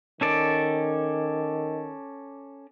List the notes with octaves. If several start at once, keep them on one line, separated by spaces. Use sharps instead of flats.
D#3 C#4 A4 D5